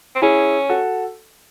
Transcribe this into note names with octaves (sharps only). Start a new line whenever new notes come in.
C4
C#4 E4 G#4
F#4 A4